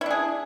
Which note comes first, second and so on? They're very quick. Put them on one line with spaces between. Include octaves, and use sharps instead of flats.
E4 D4 G#4